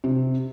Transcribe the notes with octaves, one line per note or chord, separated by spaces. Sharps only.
C3